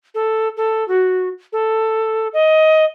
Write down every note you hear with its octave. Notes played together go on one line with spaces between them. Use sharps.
A4
A4
F#4
A4
D#5